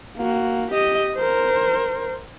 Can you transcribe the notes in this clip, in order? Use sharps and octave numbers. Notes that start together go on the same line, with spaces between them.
A#3 F#4
G4 D#5
A#4 C5